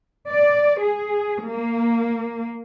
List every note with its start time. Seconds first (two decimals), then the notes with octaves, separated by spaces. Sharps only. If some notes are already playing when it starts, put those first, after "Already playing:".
0.30 D5
0.81 G#4
1.48 A#3